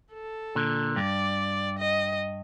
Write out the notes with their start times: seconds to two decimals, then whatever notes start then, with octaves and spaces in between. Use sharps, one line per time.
0.14 A4
0.55 A#2 D3
0.96 G2 D5
1.79 D#5